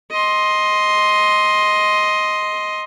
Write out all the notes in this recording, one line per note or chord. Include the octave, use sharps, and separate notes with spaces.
D#5 C6